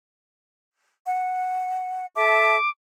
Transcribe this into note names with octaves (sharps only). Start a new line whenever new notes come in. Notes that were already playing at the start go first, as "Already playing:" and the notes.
F#5
A4 E5 A5 D6